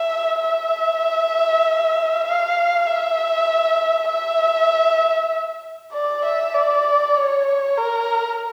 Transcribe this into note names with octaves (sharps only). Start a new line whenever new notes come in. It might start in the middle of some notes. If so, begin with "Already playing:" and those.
Already playing: E5
E5
F5
E5
E5
D5
E5
D5
C#5
A#4